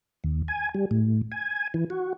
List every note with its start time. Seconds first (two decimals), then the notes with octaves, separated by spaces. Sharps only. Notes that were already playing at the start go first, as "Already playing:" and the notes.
0.24 D#2
0.48 G#5
0.74 G3
0.91 A2
1.32 G#5
1.74 E3
1.90 F#4